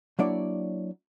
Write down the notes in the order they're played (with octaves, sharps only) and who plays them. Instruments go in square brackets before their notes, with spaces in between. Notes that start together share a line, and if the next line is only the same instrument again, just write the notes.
[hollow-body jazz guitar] F#3 A#3 D4 E4 C#5 D5